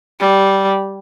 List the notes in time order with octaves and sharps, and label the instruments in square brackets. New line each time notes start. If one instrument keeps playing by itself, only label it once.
[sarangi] G3